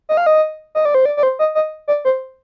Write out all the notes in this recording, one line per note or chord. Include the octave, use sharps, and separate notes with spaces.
D#5
F5
D#5
D#5
D5
C5
D5
D5
C5
D#5
D#5
D5
C5